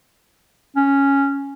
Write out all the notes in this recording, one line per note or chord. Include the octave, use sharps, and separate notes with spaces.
C#4